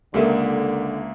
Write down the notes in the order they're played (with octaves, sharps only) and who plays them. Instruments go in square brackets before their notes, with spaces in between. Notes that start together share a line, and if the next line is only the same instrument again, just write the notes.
[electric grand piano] C#2 A#3 E5 [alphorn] D3 [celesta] G4 A4 A#4